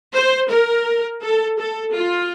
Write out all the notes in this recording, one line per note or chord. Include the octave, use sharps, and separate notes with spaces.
C5
A#4
A4
A4
F4